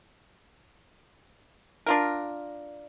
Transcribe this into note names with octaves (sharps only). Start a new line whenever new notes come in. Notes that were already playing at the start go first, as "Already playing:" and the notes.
D4 F4 A#4